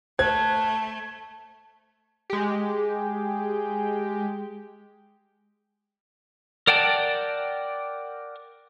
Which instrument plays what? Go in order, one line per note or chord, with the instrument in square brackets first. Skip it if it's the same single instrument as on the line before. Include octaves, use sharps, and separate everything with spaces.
[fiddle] A3 [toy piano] C5 [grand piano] G#6
[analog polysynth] G#3 G4
[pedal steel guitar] A#4 D5 F#5 G5 A5